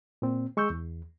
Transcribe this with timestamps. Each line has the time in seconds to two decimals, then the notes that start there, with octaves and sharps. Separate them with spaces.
0.22 A#2 C4
0.57 G#3 C#6 E6 G6
0.70 E2